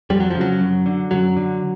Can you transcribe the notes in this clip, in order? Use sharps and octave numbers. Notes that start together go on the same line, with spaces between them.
F2 G3
F#3
C#3 F3
F#3
F#2
D3
F#2 F#3
D3